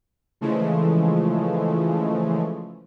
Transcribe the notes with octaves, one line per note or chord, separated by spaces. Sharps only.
C#3 E3 F3 G#3 A3